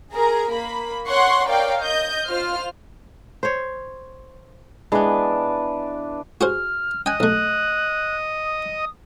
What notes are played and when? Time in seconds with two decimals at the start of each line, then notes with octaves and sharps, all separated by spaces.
0.13 G#4 A#4 A#5
0.52 A#3 B5
1.07 C#5 F#5 C6 C#6
1.47 A#4 C#5 D5 F5 G5
1.81 D#5 G6
2.26 F4 C5 F6
3.43 C5 C#5
4.92 E3 G#3 B3 D4 B4
6.41 F#4 G#4 C5 F6
7.06 D#5 G5 G#5 F#6
7.20 B1 A3 F#6
8.45 D#6